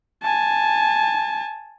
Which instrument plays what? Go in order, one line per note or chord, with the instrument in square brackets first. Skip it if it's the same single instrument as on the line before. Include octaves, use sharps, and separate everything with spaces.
[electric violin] G#5 A5